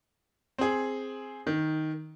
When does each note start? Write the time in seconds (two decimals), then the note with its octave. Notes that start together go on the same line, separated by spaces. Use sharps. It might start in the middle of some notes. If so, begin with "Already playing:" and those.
0.58 C4 G#4
1.47 D#3